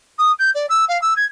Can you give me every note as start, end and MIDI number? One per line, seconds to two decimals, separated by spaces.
0.18 0.32 87
0.39 0.50 91
0.54 0.66 74
0.69 0.85 88
0.88 1.00 77
1.02 1.14 88
1.16 1.25 92